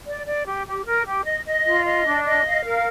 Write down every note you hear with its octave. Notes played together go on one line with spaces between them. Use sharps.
D5
D5
G4
G4
A#4
G4
D#5
D#5
F4
D#5
D4
D#5
F5
A#4